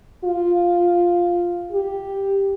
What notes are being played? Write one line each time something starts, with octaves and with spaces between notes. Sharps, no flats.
F4
G4